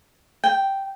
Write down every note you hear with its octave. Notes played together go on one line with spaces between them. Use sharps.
G5